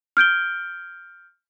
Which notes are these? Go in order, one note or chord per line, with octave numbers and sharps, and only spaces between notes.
F6 G6 D7 G7